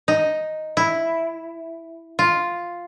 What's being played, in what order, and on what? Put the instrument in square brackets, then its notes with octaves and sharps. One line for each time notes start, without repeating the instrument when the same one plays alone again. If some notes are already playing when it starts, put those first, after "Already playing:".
[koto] D#4
E4
F4